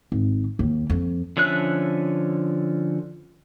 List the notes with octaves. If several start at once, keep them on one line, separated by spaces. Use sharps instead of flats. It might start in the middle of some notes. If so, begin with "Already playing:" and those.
G#1
D#2
F2
D3 F3 C#4 E5 F#6